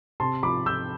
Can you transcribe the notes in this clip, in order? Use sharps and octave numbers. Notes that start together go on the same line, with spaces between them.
C3 A5 C6
F3 B5 D6
F3 E6 G6